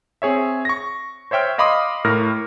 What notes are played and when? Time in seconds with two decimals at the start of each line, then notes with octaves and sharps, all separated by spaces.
0.22 C4 G#4 C#5 E5
0.65 C#6 A#6
1.31 C5 C#5 E5 G5 F6
1.58 D#5 F5 B5 C6 D6 D#6
2.04 A2 A#4 F6 A#6